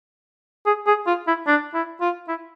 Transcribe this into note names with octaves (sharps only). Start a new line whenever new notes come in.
G#4
G#4
F4
E4
D4
E4
F4
E4